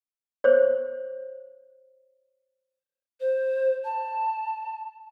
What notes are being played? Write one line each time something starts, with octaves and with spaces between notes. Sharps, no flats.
C5 C#5
C5
A5